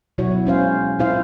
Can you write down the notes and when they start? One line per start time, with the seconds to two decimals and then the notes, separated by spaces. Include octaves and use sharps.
0.18 B2 F#3 E4 F#4 C#5
0.46 G#3 C#4 C5 F5
0.99 A#2 C4 E4 F4 C5 F5